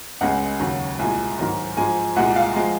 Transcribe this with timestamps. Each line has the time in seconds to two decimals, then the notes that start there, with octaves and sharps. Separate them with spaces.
0.21 C#2 C#3 G#3 F#5
0.60 D#2 C#3 F#3
0.99 C2 A#2 G#3 G#5
1.39 G#2 D#3 F#3
1.77 G#2 F3 G#3 G#5
2.16 C2 A#2 G#3 F#5
2.36 F5
2.56 F3 G#3